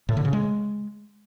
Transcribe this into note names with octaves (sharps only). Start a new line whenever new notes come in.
A2
D3
C#3
G#3